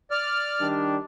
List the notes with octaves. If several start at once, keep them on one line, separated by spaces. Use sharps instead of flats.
D5 F6
D#3 G3 D4